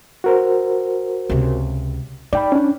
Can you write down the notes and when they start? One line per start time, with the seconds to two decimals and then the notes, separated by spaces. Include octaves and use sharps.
0.24 F#4 A#4 C5
1.29 C#2 C3
2.33 D#4 D5 G5 B5
2.52 C#4 D4